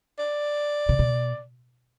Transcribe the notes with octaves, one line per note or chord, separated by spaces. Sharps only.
D5
C3
B2